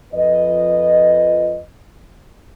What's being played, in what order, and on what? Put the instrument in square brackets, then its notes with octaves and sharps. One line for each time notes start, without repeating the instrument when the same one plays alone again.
[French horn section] F2 F3 B4 D#5